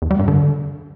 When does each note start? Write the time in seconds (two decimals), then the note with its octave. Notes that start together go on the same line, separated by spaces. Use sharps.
0.02 E2
0.11 G3
0.19 G2
0.28 D3